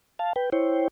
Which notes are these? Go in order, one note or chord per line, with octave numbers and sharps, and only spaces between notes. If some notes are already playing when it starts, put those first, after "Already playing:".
F5 A5
B4 G5
E4 C5 C#5 G5